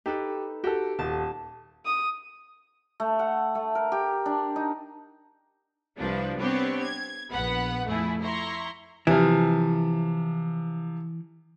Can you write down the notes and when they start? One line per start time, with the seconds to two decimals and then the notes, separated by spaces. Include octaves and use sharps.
0.06 D#4 G4 A4 B4
0.64 F#4 G4 A4
0.99 D#1 A5
1.85 D#6
3.00 A3
3.19 F#5
3.55 A3
3.75 A#4
3.92 G4
4.26 D4
4.56 D#4
5.99 C2 F3 D4 B4
6.39 B3 C4 D4 G4 C#5
6.82 G#6
7.30 A#1 B3 B4 F#5 B5
7.86 F2 A3 E4 G#4
8.21 E4 A#5 C6 C#6
9.07 C3 E3 F3